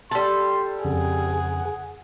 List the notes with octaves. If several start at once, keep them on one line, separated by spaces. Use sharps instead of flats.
G3 A4 C6
F2 C#3 G#4 F#5